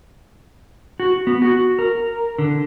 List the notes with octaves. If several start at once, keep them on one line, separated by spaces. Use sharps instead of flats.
F#4
B3
F#4
A#4
D3